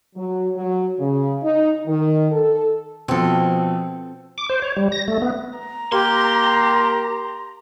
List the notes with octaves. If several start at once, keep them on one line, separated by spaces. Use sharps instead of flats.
F#3
F#3
C#3
D#4
D#3
A4
B2 F3 C4 A4
D6
C5
C#5
G3
A#6
A3
B3
A#5
A#3 G4 C6